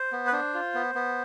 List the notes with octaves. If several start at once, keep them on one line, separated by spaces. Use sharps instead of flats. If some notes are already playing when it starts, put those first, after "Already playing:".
Already playing: C5
B3
B4
D4 C5
F4
B3
B3